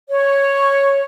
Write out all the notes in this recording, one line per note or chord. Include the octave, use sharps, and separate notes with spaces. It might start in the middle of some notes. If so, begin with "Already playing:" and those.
C#5